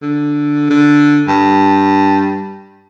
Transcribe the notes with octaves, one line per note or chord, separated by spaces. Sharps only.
D3
D3
G2